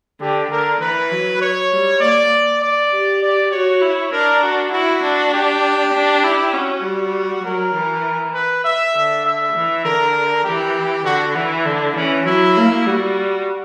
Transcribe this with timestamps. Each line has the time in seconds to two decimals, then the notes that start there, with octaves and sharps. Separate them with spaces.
0.21 D3 G4
0.51 D3 A#4
0.81 E3 B4
1.12 F#3
1.41 C#5
1.72 G3
2.01 A#3 D5
2.62 D5
2.92 G4
3.22 D5
3.52 F#4 C#5
3.82 E4
4.12 D4 A#4
4.43 F#4
4.73 E4 F#4
5.03 D4
5.33 G4
5.94 D4
6.23 E4
6.53 C#4 F#4
6.84 G3
7.43 F#3 A#4
7.74 E3
8.34 B4
8.64 E5
8.95 D3
9.25 E5
9.55 E3
9.85 D3 A#4
10.45 E3 G4
11.05 D3 F#4
11.35 E3 E4
11.66 D3
11.96 E3 C#4
12.26 F#3 E4
12.56 A#3
12.86 G3 F#4